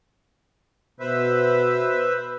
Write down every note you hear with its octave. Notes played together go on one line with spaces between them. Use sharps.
B2 B4 C5 E5